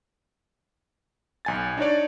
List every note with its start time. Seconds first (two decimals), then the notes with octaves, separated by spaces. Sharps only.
1.45 B1 G#5 A6
1.77 D4 D#4 C#5 D5